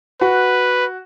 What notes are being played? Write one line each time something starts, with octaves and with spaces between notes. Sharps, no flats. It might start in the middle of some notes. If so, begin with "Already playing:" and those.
F#4 B4